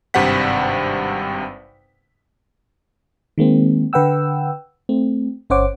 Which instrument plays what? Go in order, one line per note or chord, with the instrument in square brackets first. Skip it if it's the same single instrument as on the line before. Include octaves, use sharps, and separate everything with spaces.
[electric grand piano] G#1 G2 C3 C5 F#5 B6
[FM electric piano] D#3 G#3 A#3 C4
D3 B4 F#5 G5 E6
A3 C4
G1 C#4 C5 C#5 F#5 D6